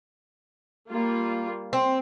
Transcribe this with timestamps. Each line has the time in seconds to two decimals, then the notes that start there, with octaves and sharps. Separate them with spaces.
0.90 G3 A#3 F4
1.73 C4